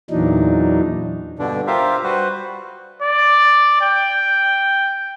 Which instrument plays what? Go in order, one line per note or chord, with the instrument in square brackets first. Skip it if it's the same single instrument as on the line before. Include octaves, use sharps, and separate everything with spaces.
[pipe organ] E2 A#2 E3 F#3 D4 D#4
[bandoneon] G2 B2 D3 D4
F4 G4 A#4 C5 E5 F5
G3 F#4 B4 C5
[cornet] D5
G5